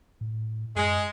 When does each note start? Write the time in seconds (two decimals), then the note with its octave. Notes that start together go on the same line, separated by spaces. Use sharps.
0.21 A2
0.76 F#2 G#3